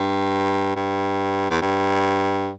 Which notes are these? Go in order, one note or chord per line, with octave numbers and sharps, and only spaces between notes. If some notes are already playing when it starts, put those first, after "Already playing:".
Already playing: G2
G2
E2
G2